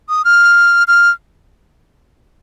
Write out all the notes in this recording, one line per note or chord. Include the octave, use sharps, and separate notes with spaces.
D#6
F6
F6